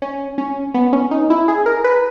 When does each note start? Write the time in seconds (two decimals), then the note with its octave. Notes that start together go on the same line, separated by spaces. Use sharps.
0.02 C#4
0.38 C#4
0.74 B3
0.93 C#4
1.11 D#4
1.30 E4
1.48 G#4
1.66 A#4
1.84 B4